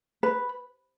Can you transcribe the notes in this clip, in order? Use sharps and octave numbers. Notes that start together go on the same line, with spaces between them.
B4